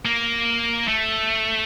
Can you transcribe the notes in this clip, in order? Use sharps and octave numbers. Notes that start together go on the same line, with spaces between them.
A#3
A3